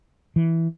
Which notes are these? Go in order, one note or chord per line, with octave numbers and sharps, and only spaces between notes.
E3